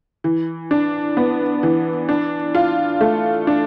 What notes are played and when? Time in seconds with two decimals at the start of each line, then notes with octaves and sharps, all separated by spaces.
0.24 E3
0.71 D4
1.17 B3
1.63 E3
2.09 D4
2.55 F4
3.01 A3
3.47 D4